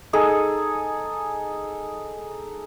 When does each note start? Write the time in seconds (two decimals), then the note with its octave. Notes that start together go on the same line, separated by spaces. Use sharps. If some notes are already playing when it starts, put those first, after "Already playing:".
0.13 D#4 G#4 A4